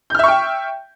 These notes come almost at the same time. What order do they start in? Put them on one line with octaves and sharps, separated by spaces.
G6 F6 E5 C#6 G5